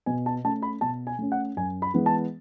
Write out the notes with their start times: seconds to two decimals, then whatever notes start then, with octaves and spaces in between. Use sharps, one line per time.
0.06 B2 G#5
0.26 A5
0.44 A3 C#4 A5
0.62 B5
0.81 B2 A5
1.07 G#5
1.19 A3 C#4
1.32 F#5
1.56 F#2 G#5
1.82 B5
1.94 E3 G#3 B3
2.06 A5